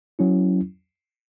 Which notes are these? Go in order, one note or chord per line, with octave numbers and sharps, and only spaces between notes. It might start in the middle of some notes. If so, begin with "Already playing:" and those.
F#3 C#4 E4